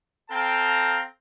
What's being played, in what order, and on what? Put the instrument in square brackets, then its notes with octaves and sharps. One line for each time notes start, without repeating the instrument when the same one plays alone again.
[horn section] C4 A4 F5 G5 A5 A#5